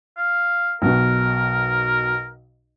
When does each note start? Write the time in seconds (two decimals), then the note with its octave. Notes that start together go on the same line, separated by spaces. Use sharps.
0.17 F5
0.82 B1 B2 A#4